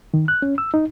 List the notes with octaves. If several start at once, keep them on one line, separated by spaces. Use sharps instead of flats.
D#3
F#6
C#4
E6
D#4